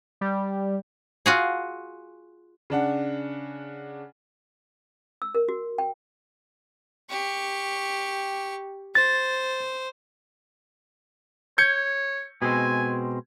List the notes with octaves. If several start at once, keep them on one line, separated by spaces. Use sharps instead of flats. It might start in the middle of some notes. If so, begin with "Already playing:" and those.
G3
F4 F#4 G#4
C#3 D4 F#5
E6
A#4
F#4
G5
G4 C#6
C5 A6
C#5 G6 G#6 C#7
B2 G#3 C4 G#5